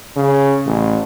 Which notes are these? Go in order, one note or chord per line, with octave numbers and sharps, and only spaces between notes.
C#3
A1